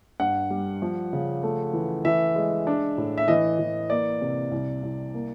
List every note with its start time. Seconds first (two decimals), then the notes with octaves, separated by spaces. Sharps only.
0.20 G2 F#5
0.50 G3
0.82 F3
1.13 C#3
1.43 A3
1.73 E3
2.05 E3 E5
2.36 G#3
2.67 D4
2.98 A2
3.18 E5
3.28 E3 D#5
3.59 E3
3.90 A#3 D5
4.21 C3
4.51 C2
4.83 C2
5.14 A#3